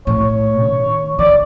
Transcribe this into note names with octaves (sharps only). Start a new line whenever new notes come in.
A2 C#5
D#3
D3 D5